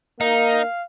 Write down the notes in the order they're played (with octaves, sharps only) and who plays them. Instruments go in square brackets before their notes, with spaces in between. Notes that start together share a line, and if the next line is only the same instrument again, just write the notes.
[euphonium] A#3 [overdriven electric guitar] D#4 [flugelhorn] F5